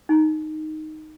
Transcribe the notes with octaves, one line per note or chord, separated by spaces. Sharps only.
D#4